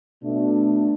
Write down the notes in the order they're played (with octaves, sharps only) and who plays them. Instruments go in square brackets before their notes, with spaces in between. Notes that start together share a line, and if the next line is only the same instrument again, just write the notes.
[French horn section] B2 A3 D4